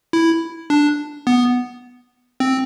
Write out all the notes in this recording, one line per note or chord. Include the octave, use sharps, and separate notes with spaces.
E4
D4
B3
C4